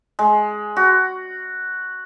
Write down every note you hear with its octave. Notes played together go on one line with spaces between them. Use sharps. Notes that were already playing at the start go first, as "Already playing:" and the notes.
G#3
F#4